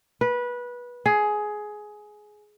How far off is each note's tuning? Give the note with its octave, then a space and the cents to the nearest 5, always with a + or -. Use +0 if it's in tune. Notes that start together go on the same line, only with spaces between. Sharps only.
B4 -20
G#4 +15